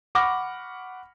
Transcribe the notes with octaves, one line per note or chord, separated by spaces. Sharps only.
F#5 B5 C#6 D6 F6 A#6